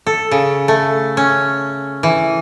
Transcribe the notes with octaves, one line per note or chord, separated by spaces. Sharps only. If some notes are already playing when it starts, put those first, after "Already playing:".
A4
C#3
A3
C#4
E3